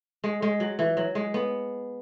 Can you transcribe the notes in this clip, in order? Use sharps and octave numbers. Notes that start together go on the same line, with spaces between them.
G#3
G#3
F#3
E3
F#3
G#3
B3